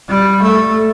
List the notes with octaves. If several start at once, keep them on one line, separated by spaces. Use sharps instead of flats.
G3
A3